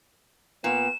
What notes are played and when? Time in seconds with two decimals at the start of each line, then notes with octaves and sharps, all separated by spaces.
0.64 A#2 B3 E7